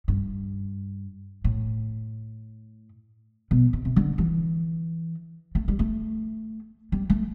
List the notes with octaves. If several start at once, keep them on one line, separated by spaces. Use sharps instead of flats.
G2
A2
B2
C3
C3
D3
E3
A3
G3
A3
G3
A3